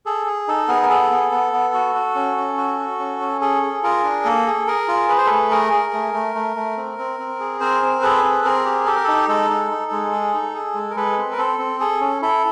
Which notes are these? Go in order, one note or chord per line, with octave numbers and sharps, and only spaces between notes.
G#4 A4
G#4
D#4 A4
B3 G#4 A#4
A#4
G#4 A4
B3
B3
B3
F#4
F#4
C#4
C#4
F#4
F#4
C#4
C#4
G#4 A4
G#4
F4 G#4 A#4
D4
A#3 A4
G#4
G#4 A#4
F4
G#4 B4
C5
A3 A4 B4
G#4 A#4
G#4
A3
A3
A3
A3
C4
C4
C4
G#4
C4 A#4 C5
C4
G#4 A4 B4
C4
C4 G#4 A#4
G4
G4 A4
A#4
D#4 A4
G#3 A4
D#4
D#4
G#3
G#4
D#4
G#4
G#3
A#4
G#3 A4 B4
C4
A#4
C4 A4
C4
G#4 A4
C#4
E4 A4